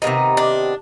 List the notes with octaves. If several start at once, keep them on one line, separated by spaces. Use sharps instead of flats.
C3 D#3 G#3 B3 D#4
D4